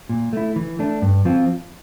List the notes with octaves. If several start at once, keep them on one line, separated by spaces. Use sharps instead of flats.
A#2
A3 E4
E3
A3 D4
G2
F3 C4 F4